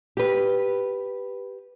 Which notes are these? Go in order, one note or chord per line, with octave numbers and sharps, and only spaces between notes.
G4 B4